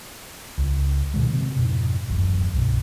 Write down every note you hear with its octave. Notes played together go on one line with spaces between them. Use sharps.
C#2
G#2 B2 D#3 G#3
A2 C3 G#3 C4
F2 G#2 B2
D1 G#1 F#2 E3
C2 G2 B2